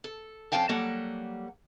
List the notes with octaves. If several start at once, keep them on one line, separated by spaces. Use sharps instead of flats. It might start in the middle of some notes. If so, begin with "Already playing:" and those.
A4
F2 C#4 F5 G5 A5
F#3 G3 A#3 A4 F#5